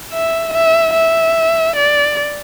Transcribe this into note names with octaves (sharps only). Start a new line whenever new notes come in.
E5
E5
E5
D5